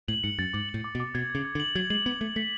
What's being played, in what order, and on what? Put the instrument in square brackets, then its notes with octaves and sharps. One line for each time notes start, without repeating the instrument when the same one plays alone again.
[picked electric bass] A2 [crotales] F#7
[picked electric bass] G#2 [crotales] C#7
[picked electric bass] F#2 [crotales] A6
[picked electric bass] G#2 [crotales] D6
[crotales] F#7
[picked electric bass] A2
[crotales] D6
[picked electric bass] B2
[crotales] D6
[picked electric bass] B2 [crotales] G#6
[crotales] G#6
[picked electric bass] C#3
[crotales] G#6
[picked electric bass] D3
[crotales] F#7
[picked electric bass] F#3 [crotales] G#6
[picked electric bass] G#3 [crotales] F#7
[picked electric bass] B3 [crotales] G#6
[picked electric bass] A3 [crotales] G#6
[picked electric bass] A3 [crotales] B6